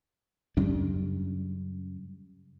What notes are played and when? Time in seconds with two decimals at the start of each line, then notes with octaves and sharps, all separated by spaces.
0.57 F#2 C#3 G3 D4